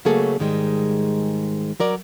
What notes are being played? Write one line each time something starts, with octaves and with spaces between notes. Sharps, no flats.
C#3 F#3 A3 A#3 G#4 A4
G#2 D#3 G3 G#3
F#3 A#4 D5